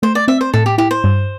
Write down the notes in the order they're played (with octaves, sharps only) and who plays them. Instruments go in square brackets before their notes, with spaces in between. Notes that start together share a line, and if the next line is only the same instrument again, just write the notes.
[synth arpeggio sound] A3 [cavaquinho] C5
[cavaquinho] D5
[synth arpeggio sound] C4 [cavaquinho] E5
[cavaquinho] C5
[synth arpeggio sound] A2 [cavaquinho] A4
[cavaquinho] G4
[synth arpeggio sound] E4 [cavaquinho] G4
[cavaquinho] C5
[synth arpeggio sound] G2